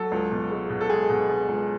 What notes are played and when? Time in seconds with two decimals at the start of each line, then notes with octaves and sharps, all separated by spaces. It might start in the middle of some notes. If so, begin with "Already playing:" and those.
Already playing: F#3 A4
0.11 C#2
0.31 B2
0.51 G#3
0.70 B2
0.81 A4
0.90 G#3 G#4
1.10 B2
1.29 B2
1.48 C#2